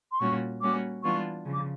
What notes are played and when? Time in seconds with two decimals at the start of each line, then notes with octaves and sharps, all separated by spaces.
0.12 C6
0.20 A#2 G3 A#3 C#4 F#4 C#6
0.61 G3 A#3 C#4 F#4 D6
1.03 E3 G3 B3 D4 F4 C#6
1.45 C#3 F3
1.53 D6